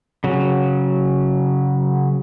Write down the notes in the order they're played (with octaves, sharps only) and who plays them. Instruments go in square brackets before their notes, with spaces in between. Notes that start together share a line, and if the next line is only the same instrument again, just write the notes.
[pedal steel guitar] C#3 F#3